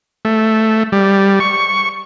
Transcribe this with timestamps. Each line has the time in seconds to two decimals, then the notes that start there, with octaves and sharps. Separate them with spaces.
0.25 A3
0.92 G3
1.40 C#6